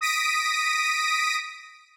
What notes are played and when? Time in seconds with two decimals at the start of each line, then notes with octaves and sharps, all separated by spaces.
0.01 D#6 A#6 B6 D7 D#7